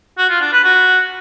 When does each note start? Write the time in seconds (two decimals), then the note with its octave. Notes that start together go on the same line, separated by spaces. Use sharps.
0.18 F#4
0.30 F4
0.41 D4
0.53 B4
0.65 F#4